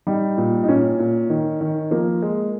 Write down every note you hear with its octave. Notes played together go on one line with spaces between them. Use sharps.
G3 D#4
A#2
D#4
A#2 C#4
A#2
D#3
D#3
F3 A#3
G#3